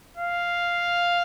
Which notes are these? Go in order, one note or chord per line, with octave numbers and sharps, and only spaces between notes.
F5